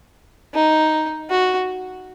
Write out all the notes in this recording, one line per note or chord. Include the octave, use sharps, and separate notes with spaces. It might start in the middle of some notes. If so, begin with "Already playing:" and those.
D#4
F#4